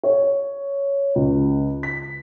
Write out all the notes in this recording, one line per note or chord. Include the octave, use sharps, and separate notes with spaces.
C#5
C#2
B6